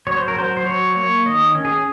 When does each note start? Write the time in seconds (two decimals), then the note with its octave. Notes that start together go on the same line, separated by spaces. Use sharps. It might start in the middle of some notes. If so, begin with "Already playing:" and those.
0.07 F#3 C#5
0.17 C5
0.28 A#4
0.37 F#3 C5
0.57 C5
0.66 F#3 C#5
0.96 A#3 C#5
1.26 D#3 D#5
1.55 C#4
1.65 G#4